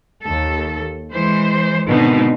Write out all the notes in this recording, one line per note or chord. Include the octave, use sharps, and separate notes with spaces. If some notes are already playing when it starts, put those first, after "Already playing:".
D#2 A4
E3 G#3 C5
G#2 B2 D3 D#3 C4 D#4